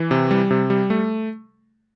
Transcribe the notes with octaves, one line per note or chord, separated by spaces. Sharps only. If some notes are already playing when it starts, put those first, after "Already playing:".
Already playing: E3
C3
G3
C3
G3
A3